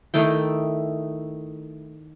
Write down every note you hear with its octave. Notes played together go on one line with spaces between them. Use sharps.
D#3 A3 E4 G5